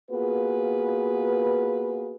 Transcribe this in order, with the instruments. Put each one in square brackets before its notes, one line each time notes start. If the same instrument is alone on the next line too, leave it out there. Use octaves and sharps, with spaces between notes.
[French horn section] A#3 B3 F4 F#4 G#4 B4